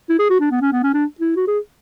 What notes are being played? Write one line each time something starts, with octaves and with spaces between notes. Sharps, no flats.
E4
G#4
F#4
D4
B3
C#4
B3
C#4
D4
E4
F#4
G#4